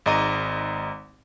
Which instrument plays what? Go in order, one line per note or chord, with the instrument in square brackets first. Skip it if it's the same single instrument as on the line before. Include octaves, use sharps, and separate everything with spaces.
[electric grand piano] G#1 G#2 D#5 A#5 D#7